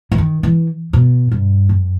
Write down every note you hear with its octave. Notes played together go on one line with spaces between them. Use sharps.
E3
D#3
E3
B2
G2
F#2